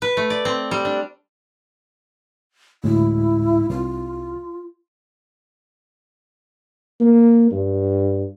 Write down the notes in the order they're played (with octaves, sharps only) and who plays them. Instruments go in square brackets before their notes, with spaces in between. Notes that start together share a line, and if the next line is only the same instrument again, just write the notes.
[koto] B4
A3
D5
C4
G3
D4
[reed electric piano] D2 A2 G#3 [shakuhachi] E4
[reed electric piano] C2 [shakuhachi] F4
[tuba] A#3
G2